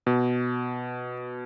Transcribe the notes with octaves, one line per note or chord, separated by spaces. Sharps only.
B2